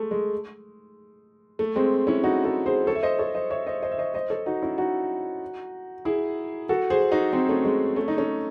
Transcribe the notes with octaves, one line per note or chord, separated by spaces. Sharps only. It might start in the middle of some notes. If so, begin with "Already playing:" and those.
Already playing: G#3 A3
G#3
A3
G#3 C4
C#4 E4
D#4 F#4
F#4 A4
G#4 C5
A4 C#5
E5
C5 D#5
A4 C#5
C5 D#5
C#5 E5
C5 D#5
C5 D#5
E5
C5 D#5
C5 D#5
A4 C#5
D#4 F#4
C#4 E4
D#4 F#4
E4 G#4
F#4 A4
G#4 C5
D#4 F#4
C4 D#4
A3 C#4
G#3
A3 C#4
D#4
A3 C#4